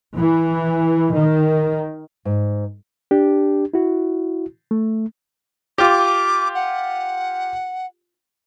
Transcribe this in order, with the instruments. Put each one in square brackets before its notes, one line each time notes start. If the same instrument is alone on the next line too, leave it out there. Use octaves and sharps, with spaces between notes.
[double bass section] E3
D#3
[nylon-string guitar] G#2
[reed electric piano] D4 G4
E4 F#4
A3
[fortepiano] F4 G4 [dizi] D6
[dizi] F#5